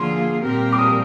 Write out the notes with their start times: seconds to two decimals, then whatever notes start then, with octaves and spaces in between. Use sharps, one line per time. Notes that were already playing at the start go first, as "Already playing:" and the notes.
Already playing: D3 F3 A#3 F4 G#4 C6
0.42 A#2 G3 C4 G4 A#4
0.72 D6
0.79 D#6